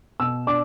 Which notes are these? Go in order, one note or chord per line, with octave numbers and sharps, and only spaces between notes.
B2 E6
D4 D6